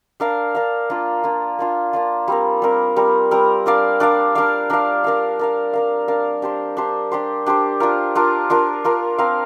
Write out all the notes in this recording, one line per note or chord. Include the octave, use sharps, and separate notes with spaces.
D4 A#4 F5
D4 A#4 F5
A#3 D4 F4
A#3 D4 F4
A#3 D4 F4
A#3 D4 F4
G3 C4 A#4
G3 C4 A#4
G3 C4 A#4
G3 C4 A#4
D4 A#4 D5 F5
D4 A#4 D5 F5
D4 A#4 D5 F5
D4 A#4 D5 F5
D4 A#4 F5
D4 A#4 F5
D4 A#4 F5
D4 A#4 F5
D4 G4 C5
D4 G4 C5
D4 G4 C5
D4 G4 C5
D4 F4 A#4
D4 F4 A#4
D4 F4 A#4
D4 F4 A#4
C4 A#4 F5